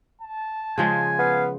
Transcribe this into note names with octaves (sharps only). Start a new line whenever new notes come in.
A5
C#3 F3 G#3 G#5
B3 F5